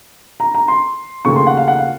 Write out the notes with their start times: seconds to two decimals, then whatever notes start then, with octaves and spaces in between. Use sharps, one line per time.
0.40 A#5
0.54 A#5
0.68 C6
1.25 D#2 C#3 F3 A3 C#6
1.36 C6
1.47 F#5
1.57 F5
1.68 F#5
1.78 F5